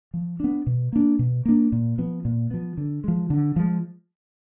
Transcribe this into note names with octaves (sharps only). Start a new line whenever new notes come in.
F3
B3 D4
B2
A#3 D4
B2
A#3 D4
A#2
F3 B3
A#2
F3 B3
D3
F3 G#3
D3
F3 G#3